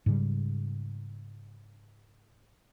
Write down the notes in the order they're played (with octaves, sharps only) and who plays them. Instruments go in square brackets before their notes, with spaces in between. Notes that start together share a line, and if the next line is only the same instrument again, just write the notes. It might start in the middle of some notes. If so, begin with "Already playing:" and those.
[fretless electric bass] G#2 C#3 G3